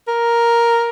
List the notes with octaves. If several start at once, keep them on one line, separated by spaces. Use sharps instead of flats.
A#4